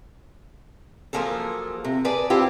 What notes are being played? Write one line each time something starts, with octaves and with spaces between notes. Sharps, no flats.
F3 F#3 A#3 G#4 A4
C3
G#4 B4 D5 A5
C4 E4 F4 G4